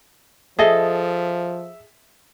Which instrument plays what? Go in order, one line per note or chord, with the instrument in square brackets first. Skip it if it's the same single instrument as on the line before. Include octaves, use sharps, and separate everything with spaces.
[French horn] F3 [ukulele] G#4 A4 D#5 [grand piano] E5